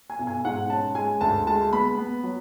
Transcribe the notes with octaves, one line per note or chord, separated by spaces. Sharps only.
G#5
B1
G#5
G#2 F#5
C#4 A5
G#3 G#5
D2 A5
G#3 A5
B3 B5
B3
F#3